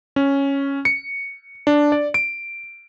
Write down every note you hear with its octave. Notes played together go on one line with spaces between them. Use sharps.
C#4
C#7
D4
D5
D7